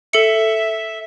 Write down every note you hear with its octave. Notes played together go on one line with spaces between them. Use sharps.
A4 E5 C#7